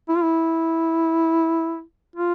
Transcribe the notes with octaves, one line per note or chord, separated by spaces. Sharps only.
E4
F4
E4
F4